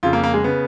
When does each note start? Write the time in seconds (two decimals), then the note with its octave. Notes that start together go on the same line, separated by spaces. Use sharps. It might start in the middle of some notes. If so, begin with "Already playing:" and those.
0.03 F2 C#3 F4
0.13 A#3
0.23 A#3
0.34 G#3
0.44 C#3 B3